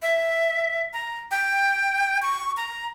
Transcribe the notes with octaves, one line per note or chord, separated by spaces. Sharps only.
E5
A#5
G5
C#6
A#5